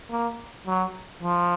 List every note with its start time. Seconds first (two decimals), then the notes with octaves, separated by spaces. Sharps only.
0.11 A#3
0.67 F#3
1.23 F3